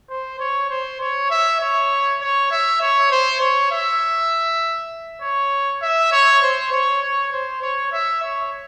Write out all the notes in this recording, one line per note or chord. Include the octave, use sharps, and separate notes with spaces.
C5
C#5
C5
C#5
E5
C#5
C#5
E5
C#5
C5
C#5
E5
C#5
E5
C#5
C5
C#5
C#5
C5
C#5
E5
C#5